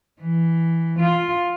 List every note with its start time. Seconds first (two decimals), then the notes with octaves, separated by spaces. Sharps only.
0.21 E3
1.00 F4